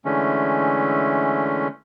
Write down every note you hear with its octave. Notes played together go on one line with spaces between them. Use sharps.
D3 E3 G#3 A3 C#4